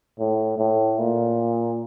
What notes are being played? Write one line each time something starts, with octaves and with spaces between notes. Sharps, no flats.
A2
A2
A#2